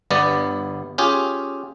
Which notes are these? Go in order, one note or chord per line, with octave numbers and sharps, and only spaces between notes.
G1 G2 B3 D5
C#4 F4 G4 G#4